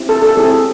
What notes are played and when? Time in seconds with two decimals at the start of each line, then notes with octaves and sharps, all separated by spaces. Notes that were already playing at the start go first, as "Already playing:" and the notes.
Already playing: C4 E4 G4
0.09 A4
0.22 A4
0.37 C4 E4 G4 G#4